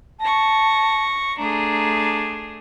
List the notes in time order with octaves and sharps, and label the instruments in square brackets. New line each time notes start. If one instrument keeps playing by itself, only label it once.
[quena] A5 [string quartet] C#6 A#6
[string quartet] A3 D4 G#4 [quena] A#5